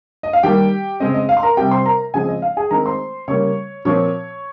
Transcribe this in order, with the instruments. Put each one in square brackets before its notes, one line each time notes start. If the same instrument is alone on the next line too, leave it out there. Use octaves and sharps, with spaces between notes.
[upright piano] D#5
F5
D#3 G3 A#3 G4 G5
C#3 G#3 C4 D#5
D#5
F5
C6
A#4 A#5
C3 G3 C4 G4 G5
C5 C6
A#4 A#5
C#3 F3 G#3 C4 G#4 G#5
D#5
F5
G#4 G#5
D#3 G#3 C4 A#4 A#5
C5 C6
C#3 G3 A#3 C#5 C#6
A#2 F3 C4 C#5 C#6